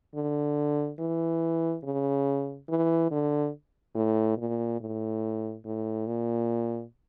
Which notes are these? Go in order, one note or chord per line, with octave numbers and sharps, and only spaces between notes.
D3
E3
C#3
E3
D3
A2
A#2
A2
A2
A#2